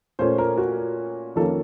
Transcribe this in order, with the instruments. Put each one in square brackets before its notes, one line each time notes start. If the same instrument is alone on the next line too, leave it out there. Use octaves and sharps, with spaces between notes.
[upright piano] A#2 A3 C#4 C5
A#4
F#4
F2 D#3 A#3 C#4 A4